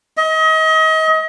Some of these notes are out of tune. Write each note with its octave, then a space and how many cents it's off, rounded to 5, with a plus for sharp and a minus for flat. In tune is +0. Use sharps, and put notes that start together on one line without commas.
D#5 +35